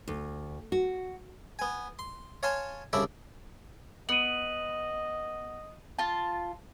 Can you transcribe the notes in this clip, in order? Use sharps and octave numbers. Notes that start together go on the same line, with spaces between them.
D2
F#4
B3 G#5
C6
C#5 F5 G#5 A5 C6
C2 C#3 D4 E4 D5 E5
B3 D#5 D#7 F#7
F4 A5